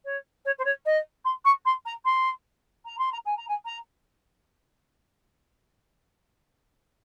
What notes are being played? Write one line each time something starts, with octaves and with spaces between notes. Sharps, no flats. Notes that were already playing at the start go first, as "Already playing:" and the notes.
C#5
C#5
C5
C#5
D#5
C6
C#6
C6
A#5
C6
A#5
C6
A#5
G#5
A#5
G#5
A#5